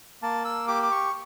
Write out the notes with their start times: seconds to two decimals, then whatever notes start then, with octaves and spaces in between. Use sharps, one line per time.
0.22 A#3 A5
0.45 E6
0.68 G4 D6
0.83 D6
0.91 C#6